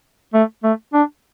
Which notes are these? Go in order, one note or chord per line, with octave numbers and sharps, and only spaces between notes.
A3
A3
D4